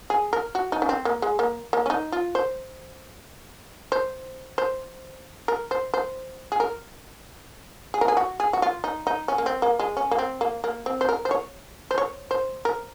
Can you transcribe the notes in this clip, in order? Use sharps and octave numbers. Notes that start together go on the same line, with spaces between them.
G#4
A#4
F#4
D#4
C#4
C4
A#3
G#3
A#3
A#3
C#4
D#4
F4
C5
C5
C5
A#4
C5
C5
G#4
A#4
G#4
A#4
G#4
F#4
G#4
F#4
F4
D#4
D#4
C#4
A#3
C4
A#3
G#3
C#4
A#3
C4
A#3
A#3
C4
C5
A#4
C5
C#5
C5
C#5
C5
A#4